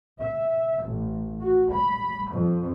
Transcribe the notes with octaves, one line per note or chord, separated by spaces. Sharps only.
E5
A1
F#4
B5
F2